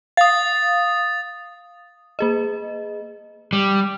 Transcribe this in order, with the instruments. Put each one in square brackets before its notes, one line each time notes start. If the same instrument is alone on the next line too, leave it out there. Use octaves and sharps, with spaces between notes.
[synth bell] F5 [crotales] D#6 A6
[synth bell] A#3 G#4 D#5
[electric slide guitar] G3